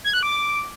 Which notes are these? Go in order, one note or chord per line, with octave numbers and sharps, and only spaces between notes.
G#6
F#6
D6